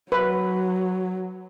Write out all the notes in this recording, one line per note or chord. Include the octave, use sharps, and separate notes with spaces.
F#3 B4